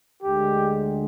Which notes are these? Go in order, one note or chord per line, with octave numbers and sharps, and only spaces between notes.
D2 D3 G#3 G4